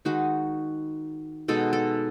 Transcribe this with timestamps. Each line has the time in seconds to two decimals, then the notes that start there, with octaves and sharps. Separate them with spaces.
0.05 D#3 G#3 D#4 F#4
1.48 B2 G#3 D#4 A4
1.73 A4